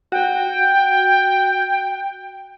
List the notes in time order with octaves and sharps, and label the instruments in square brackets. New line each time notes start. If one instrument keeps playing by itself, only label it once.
[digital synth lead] F#4 [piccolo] G5